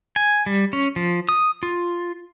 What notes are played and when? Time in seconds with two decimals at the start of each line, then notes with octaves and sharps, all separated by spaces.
0.16 G#5
0.46 G3
0.73 C#4
0.96 F3
1.29 D#6
1.63 F4